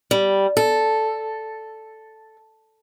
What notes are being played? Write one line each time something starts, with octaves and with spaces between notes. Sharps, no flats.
G3
A4